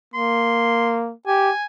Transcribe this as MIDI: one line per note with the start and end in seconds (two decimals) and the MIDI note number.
0.14 1.13 58
0.14 0.98 84
1.27 1.51 67
1.27 1.65 80